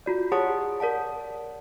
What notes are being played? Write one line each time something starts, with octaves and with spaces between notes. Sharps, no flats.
F4 F#4 D5
G4 G#4 C#5 F#5 A5 D#6
A#4 D5 F#5 A5